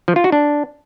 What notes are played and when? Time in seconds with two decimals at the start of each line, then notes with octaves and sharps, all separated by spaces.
0.08 F3
0.16 F4
0.24 F#4
0.32 D4